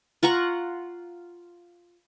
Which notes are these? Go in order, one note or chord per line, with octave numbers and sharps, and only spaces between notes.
F4 F#5 A#5 C#6